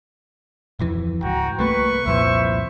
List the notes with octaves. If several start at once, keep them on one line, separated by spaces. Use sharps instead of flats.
D1 F2 E3
C#2 G#2 F#4 G5 A#5
C2 A3 A#3 B4 C#6
C2 F2 A#2 E4 C5 E5